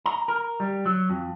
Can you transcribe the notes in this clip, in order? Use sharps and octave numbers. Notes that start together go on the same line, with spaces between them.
A#5
A#4
G3
F#3
F2